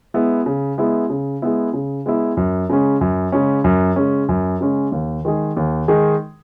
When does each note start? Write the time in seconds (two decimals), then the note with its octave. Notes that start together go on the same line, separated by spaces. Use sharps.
0.14 G#3 B3 E4
0.46 C#3
0.78 G#3 B3 E4
1.10 C#3
1.42 G#3 B3 E4
1.73 C#3
2.06 G#3 B3 E4
2.37 F#2
2.69 C#3 G#3 C#4
3.01 F#2
3.32 C#3 G#3 C#4
3.64 F#2
3.96 C#3 G#3 C#4
4.29 F#2
4.61 C#3 G#3 C#4
4.92 D#2
5.25 D#3 G#3 D#4 G#4
5.56 D#2
5.88 D#3 G#3 D#4 G#4